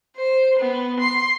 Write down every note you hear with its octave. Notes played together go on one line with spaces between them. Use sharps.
C5
B3
C6